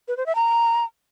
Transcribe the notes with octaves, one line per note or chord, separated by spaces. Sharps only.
B4
C5
E5
A#5